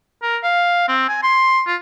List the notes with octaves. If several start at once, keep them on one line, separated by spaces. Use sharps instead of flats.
A#4
F5
C4
G#5
C6
F4